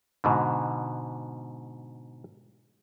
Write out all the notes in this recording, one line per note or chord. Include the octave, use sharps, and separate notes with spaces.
G#2 B2 D3